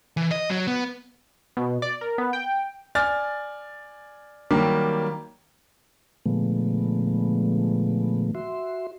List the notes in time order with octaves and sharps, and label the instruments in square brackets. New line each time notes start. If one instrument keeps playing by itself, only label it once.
[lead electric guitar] E3
D#5
F#3
B3
[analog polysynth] B2
D5
A#4
B3
G5
[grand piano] D5 G#5 F6 A6
D#3 F#3 G3 A#3 G4
[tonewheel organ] A#2 D3 F3 G#3 A3 B3
F#4 E5 C6